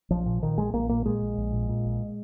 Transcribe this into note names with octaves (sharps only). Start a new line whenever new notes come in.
A#1 F3
A#2
A#2 D#3
A#1 G#3
A#1 A#3
A#2 A#3
A#2 G#3
A#1
A#1
A#2
A#2
A#1